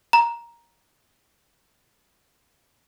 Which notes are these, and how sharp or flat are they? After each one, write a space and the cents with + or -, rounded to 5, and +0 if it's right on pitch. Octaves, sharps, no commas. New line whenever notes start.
A#5 +10